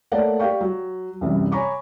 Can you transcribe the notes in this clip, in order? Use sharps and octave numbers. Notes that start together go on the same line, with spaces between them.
A3 A#3 A#4 C#5 D5 F#5
G4 D5 F5 G5 C#6
F#3
C2 F#2 E3 G3
C#5 G#5 A#5 B5 C#6 D6